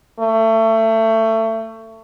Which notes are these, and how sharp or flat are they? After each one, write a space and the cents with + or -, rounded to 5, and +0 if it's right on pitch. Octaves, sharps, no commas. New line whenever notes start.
A3 +25